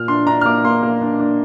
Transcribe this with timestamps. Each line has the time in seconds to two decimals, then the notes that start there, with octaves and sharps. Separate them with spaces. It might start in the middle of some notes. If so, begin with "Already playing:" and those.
Already playing: A#2 F6
0.08 D4 C6
0.27 D4 A#5
0.41 F6
0.45 A#3 D6
0.64 A#3 C6
0.83 A#3
1.01 D4
1.19 D4